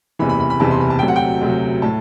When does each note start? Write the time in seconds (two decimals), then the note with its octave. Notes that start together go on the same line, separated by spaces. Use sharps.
0.19 F#1 E2 C3 E3 B5
0.29 B5
0.40 B5
0.50 B5
0.60 F#1 E2 C3 E3 A5
0.71 C6
0.80 B5
0.90 A5
0.99 D2 C3 F#3 G5
1.08 F#5
1.16 G5
1.41 D2 C3 F#3
1.82 A2 A5